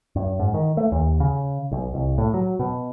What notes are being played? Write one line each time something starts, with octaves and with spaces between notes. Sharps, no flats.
F#2
G#2
D#3
A3
D#2
C#3
B1
C2
A2
F#3
B2